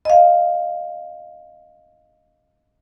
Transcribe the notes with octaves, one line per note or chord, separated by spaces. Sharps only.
D#5 F5